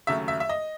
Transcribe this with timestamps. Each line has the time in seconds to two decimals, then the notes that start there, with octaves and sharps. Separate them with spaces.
0.07 D#2 C#3 F#3 A3 E5
0.28 E5
0.40 E5
0.49 D#5